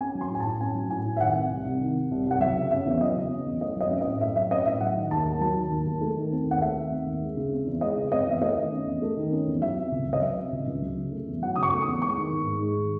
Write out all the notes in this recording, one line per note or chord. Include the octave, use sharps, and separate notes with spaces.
C#4 G#5
F#3
C6
A2 G#5
A5
A2
C#4 G#5
F#3
A2 G#5
A2
E5
D#3 F#5
C3
C2
C2
D#3
C3
C2
C2 F#5
F#3 E5
C#3
C#4 E5
E2
F#3 D#5
C#3
C#4
E2
A3 D#5
F#3 D#5
C#4 E5
D#5
A2
A3 E5
F#3 E5
C#4 D#5
A2 E5
F#3 F#5
D#3
D#2 A5
D#2
F#3 A5
D#3
D#2
D#2
A3
D#3
C4
D#2 F#5
A3 E5
D#3
C4
D#2
G#3
C#3
C4
E2
G#3 D#5
C#3
C4 D#5
E2 E5
A3 D#5
D#3
C#4
E2
A3
D#3
C#4
E2
F#3 E5
C3
C#2
C#2
D#5
F#3 E5
C3
C#2
C#2
F#3
C#3
A3
E2
F#3 F#5
C#3 D#6
C#6
A3
D#6
E2
G#3 C#6
D#3
G#2
G#2
G#3
D#3